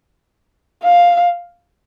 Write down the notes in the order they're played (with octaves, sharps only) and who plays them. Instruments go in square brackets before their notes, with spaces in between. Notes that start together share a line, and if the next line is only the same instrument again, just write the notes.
[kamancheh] F5